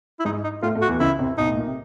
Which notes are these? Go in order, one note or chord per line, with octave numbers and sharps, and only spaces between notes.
E4
G#2 G#3 D#4
D#4
A2 A3 F4
A2 A3
F#4
E2 E3
C#2 C#3 E4
C2 C3
B1 B2 D#4
A2
A#2
C3